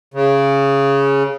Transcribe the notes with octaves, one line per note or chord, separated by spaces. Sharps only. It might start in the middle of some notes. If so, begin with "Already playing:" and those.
C#3